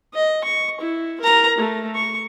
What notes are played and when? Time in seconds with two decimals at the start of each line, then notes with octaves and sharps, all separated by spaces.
0.14 D#5
0.44 C#6
0.81 E4
1.21 A#4 A#5
1.58 A3
1.95 C#6